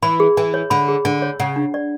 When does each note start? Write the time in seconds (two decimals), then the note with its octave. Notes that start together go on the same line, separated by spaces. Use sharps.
0.02 E3 B5
0.20 G#4
0.37 E3 G#5
0.54 C#5
0.70 D3 B5
0.88 G#4
1.05 D3 G#5
1.22 C#5
1.40 C#3 F#5
1.56 D4
1.74 D5